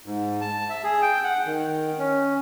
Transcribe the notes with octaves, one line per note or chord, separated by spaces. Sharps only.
G#2
A5
E5
G#4
G5
F#5
D#3
C#4